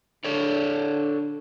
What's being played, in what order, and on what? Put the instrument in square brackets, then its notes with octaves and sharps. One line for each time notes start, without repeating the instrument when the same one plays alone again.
[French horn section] D3 D4 [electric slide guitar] A4 C#5 D5